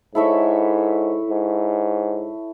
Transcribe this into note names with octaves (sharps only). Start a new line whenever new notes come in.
G#2 E4 A4 C#5 E5
G#2